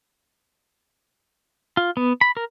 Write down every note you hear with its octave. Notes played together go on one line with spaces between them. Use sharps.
F4
B3
B5
A#4